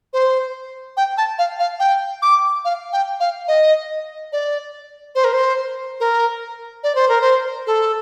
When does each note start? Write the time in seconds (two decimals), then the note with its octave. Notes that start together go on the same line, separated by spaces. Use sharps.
0.13 C5
0.97 G5
1.18 A5
1.39 F5
1.59 F5
1.80 G5
2.22 D6
2.65 F5
2.93 G5
3.20 F5
3.48 D#5
4.32 D5
5.15 C5
5.24 A#4
5.33 C5
6.00 A#4
6.83 D5
6.95 C5
7.09 A#4
7.21 C5
7.67 A4